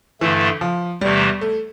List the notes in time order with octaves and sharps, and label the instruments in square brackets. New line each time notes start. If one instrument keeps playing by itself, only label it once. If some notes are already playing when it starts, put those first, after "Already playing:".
[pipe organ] G2 D3 A3 [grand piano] E3
[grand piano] F3
[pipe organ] E2 C3 E3 A3 [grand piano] G3
[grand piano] A3